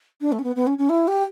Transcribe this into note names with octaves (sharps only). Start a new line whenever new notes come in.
D4
A3
C#4
B3
B3
C#4
C#4
E4
G4